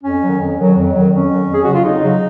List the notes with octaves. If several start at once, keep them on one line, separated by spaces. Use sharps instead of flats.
F2 C#4
D#3 F#3
F2
D#3 F#3
F2
D#3 F#3
F2 C#4
D#3 F#3
F2
G#4
C#3 F#3 F#4
F4
F2 D#4
C#3 F#3